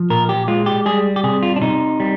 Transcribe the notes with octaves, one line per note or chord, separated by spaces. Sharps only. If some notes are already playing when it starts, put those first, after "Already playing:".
Already playing: F3
A#2 A#4
G4
G#3 F4
G4
G3 G#4
G4
C3 G#4
F4
D4
C3 D#4
G3